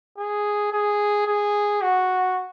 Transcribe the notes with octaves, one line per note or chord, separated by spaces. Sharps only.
G#4
G#4
G#4
F#4